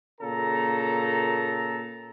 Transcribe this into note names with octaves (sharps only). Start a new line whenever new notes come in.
A#2 C#3 A4 A#5